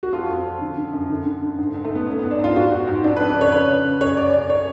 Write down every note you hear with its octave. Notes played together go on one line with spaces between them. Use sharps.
F#4
F2 F4
F2
F2
D3
D3
F#2
D3
D3
D3
G#2
G#2
A3
G#2 B3
G#2 C#4
B3
G#2
D4
G#2 F4
G#2 F#4
G#2
G#2
F2 D4
B4
F2
D5
C#3 C#5
C#3 B4
C#3
C#3
F#2 C#5
C#3 D5
C#3 D5
C#5